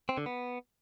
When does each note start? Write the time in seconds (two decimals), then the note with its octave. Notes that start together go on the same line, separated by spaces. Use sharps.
0.09 C4
0.18 D3
0.26 B3